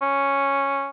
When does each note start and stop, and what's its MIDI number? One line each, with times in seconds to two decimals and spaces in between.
0.02 0.89 61